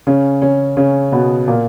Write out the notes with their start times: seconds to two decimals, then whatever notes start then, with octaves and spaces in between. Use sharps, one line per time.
0.07 C#3 C#4
0.42 C#3 C#4
0.77 C#3 C#4
1.12 B2 B3
1.47 A#2 A#3